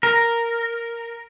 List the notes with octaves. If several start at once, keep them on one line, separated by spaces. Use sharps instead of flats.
A#4